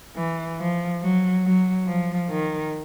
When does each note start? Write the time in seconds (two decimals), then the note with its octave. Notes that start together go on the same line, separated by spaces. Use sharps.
0.17 E3
0.59 F3
1.02 F#3
1.45 F#3
1.87 F3
2.30 D#3